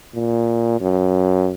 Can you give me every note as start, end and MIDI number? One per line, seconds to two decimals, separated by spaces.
0.14 0.80 46
0.80 1.53 42